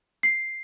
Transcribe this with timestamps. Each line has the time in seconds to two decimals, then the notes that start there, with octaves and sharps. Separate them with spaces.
0.23 C7